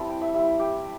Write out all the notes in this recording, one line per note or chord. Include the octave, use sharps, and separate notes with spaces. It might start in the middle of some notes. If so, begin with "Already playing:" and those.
Already playing: G3 C4 E4 A5
G5
E5
G3 C4 E4 E5
G4